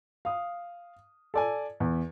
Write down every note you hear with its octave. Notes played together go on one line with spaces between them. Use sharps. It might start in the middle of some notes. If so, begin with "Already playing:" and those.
F5 D#6
A4 D5 G#5
E2